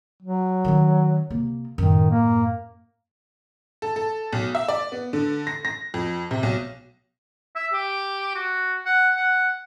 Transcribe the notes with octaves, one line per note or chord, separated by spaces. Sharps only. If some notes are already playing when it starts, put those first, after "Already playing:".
F#3
D#3 C#4
C3 A#3
F#2 A2 D#3
A#3
A4
A4
B1
E5
D5
B3
D3
A#6
A#6
F2
C3
B1
E5
G4
F#4
F#5
F#5